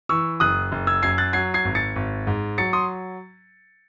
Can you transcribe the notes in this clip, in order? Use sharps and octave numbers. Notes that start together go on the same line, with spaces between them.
E3 C#6 E6
F#1 D#6 F#6
F#1
E6 G#6
F#2 G#6 C7
F#6 A6
F#3 G#6 C7
G#6 C7
G#1
A6 C#7
G#1
G#2
F#3 A6 C#7
C6 D#6